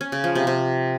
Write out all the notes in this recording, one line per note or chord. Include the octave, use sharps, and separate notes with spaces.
C#4
C#3
F3
C3
C3